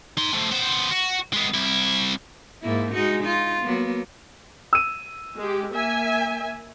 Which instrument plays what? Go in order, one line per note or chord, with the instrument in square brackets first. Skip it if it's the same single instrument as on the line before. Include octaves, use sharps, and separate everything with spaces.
[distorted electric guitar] D#4 C6
A3 C4
B3 C5
F#4
G#3 B3
C2 E4
[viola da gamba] G#2 A#3 E4
G#3 D#4 F#4
D#4 F4
F#3 A#3 B3
[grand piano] E6 D#7
[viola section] G#3 G4
A#3 E5 G#5